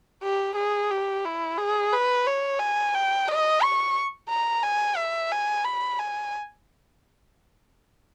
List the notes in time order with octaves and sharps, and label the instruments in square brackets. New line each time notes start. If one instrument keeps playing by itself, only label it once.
[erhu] G4
G#4
G4
E4
G#4
B4
C#5
G#5
G5
D#5
C#6
A#5
G#5
E5
G#5
B5
G#5